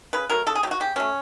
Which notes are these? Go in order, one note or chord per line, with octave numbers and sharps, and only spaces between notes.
C#3 B4
F#3 A3 A#4
C#3 A4
G#4
F#3 A3 G4
F#4
C#3 G4
F#3 A3 C#4